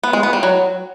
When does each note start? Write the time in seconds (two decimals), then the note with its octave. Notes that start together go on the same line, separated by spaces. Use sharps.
0.03 B3
0.13 G#3
0.23 B3
0.33 G3
0.43 F#3